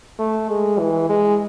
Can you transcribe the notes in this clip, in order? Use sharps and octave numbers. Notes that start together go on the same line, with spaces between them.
A3
G#3
E3
G#3